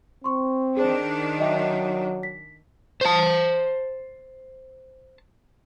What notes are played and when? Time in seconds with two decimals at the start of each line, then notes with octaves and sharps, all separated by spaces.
0.24 C4 C6 C#6
0.77 D#3 D4 G#4 C5
1.40 F#3 D#5 E5 G5
2.23 B6
3.01 C5 A5